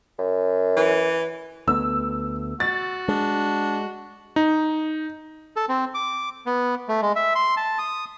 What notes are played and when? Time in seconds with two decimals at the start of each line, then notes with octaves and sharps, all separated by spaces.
0.18 F#2
0.77 E3
1.68 D2 A3 B3 E6
2.60 F#4 A6
3.08 G#3 D4
4.36 D#4
5.56 A4
5.69 C4
5.94 D6
6.46 B3
6.89 A3
7.02 G#3
7.16 E5
7.35 C6
7.57 A5
7.79 D#6